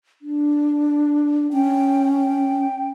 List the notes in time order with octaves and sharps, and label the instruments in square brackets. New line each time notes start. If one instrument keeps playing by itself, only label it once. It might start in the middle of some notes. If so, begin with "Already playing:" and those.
[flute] D4
[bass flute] C#4 [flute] G5
[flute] G5